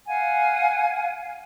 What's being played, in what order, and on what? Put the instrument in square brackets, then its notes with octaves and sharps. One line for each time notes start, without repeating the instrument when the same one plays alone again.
[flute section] F5 F#5 G#5